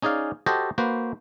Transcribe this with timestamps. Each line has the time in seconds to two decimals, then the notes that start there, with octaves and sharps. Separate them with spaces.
0.02 C#4 D#4 G#4 D5 F5
0.46 F#4 G4 A4 C5 D#5
0.78 A#3 F#4 B4 C5